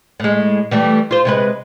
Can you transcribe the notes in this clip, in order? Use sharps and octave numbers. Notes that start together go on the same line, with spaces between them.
A2 G#3
E3 G3 A3
F4 C5
C3 G#3 B4